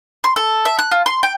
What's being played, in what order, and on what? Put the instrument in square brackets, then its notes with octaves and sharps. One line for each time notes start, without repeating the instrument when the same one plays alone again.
[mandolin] C6
A4
E5
F#6
F4
C6
G5